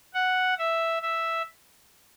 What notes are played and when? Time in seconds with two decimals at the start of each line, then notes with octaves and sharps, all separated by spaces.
0.14 F#5
0.59 E5
1.02 E5